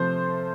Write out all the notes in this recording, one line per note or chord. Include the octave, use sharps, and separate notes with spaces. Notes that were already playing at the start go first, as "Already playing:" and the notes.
Already playing: C3 F3 A3 C5